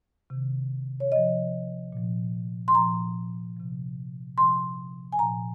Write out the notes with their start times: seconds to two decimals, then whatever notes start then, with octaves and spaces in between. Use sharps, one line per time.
0.30 C3 D#3
1.00 C#5
1.12 C3 F3 D#5
1.93 A#2 F3
2.68 C6
2.75 A#2 F3 A#5
3.57 C3 F3
4.38 C3 F3 C6
5.13 G#5
5.19 A#2 F3 A#5